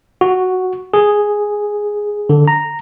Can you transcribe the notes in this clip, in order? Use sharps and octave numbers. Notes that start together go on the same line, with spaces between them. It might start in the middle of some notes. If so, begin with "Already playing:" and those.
F#4
G#4
D3
A#5